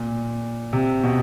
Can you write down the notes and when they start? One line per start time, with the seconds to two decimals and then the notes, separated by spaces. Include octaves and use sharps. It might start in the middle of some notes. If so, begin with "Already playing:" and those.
Already playing: A#2
0.73 C3
1.04 B2